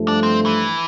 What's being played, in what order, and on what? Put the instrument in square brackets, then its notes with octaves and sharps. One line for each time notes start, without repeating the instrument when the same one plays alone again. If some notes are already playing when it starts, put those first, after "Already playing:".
Already playing: [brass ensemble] G2 F3 A3
[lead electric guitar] D4
C4
E3